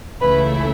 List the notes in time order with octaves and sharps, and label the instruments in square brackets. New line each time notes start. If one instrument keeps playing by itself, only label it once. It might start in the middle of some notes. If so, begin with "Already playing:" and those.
[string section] C#2 C#3 E3 A3 E4 [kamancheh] B4